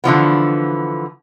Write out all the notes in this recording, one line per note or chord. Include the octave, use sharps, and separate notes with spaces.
D3 E3 F3 B3